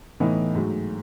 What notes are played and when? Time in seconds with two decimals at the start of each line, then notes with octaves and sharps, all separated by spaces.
0.20 A2 E3 B3 D#4
0.55 G#2 F#3 A3